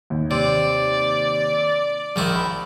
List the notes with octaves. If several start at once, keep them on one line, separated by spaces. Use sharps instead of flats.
D#2
C3 D5
A#1 D#3 E4
B5